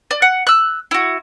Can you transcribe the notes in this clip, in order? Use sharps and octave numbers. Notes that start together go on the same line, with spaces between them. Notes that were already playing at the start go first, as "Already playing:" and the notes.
D5
F#5
E6 F#6
E4 F#4